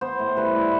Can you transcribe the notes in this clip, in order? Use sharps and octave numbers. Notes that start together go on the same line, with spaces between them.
B3 C5
A2
G3 B4
A2